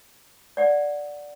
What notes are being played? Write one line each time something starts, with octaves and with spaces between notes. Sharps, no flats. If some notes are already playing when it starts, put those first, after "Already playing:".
D5 F#5